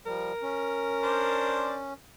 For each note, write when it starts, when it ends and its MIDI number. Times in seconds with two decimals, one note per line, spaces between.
0.06 0.33 53
0.06 0.33 55
0.06 2.00 70
0.42 1.94 61
1.03 1.76 62
1.03 1.76 72
1.03 1.76 74